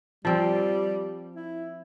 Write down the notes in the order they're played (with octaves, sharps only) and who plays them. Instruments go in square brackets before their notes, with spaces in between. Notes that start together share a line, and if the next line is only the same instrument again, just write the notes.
[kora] F3 C4 [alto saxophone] G3
[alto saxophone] E4